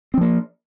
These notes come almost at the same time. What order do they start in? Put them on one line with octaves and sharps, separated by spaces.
C4 F3 A#3